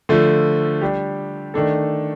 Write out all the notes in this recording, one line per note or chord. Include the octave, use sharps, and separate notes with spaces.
D3 F3 A3
G3 D4 G4
D#3 A3 D4 A4